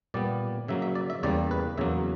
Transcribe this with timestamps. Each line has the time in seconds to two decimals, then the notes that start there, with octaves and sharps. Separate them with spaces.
0.14 A#2 G3 B3 D5
0.68 C#3 F#3 A#3 E5
0.82 E5
0.95 D5
1.10 E5
1.23 E2 C#3 G3 A#3 D5
1.51 B4
1.78 E2 C#3 F#3 A#3 E5